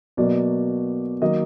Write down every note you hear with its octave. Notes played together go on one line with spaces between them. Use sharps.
B2 F#3 A#3 D5
D#3 F#3 A#3 D#5